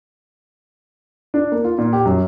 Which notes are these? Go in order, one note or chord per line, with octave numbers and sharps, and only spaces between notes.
D4
A#3
F4
A#2
G4
F#2